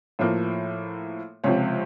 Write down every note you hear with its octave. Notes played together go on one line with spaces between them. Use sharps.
A2 F3 A#3
C#2 C3 F3 C#5